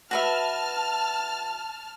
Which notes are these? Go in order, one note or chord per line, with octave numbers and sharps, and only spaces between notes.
F#4 B4 E5 A5 F6